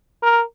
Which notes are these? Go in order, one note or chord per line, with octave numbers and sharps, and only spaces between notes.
A#4